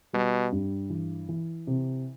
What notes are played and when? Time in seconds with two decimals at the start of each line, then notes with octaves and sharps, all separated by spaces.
0.13 B2 G3
0.52 G2
0.90 E3
1.29 E3
1.67 C3